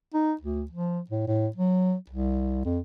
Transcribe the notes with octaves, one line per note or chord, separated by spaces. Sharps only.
D#4
D2
F3
A2
A2
F#3
C2
F2